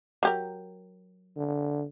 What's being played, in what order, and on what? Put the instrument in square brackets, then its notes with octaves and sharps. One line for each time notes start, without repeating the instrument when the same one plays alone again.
[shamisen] F#3 G4 A#4
[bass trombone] D3